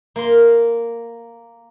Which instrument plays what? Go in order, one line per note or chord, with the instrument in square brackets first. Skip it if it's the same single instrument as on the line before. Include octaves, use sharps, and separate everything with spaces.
[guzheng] A#3 C6